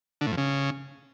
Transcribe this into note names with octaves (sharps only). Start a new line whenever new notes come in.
D3
A2
F2
C#3